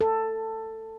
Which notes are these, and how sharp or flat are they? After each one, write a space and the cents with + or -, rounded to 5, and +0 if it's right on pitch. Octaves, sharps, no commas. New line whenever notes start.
A4 +15